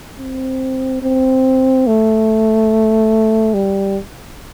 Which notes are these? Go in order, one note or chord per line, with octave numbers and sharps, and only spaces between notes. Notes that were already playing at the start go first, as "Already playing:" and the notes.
C4
C4
A3
G3